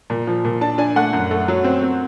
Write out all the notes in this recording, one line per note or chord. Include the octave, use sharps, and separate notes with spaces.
A#2
F3
A#2
D4 A5
D4 G#5
A3 F#5
F#2
A3
F#3
C4
C4